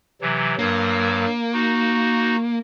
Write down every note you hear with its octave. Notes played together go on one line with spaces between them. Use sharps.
C3 E3 F#3
G2 F#3 A#3
D#4 F#4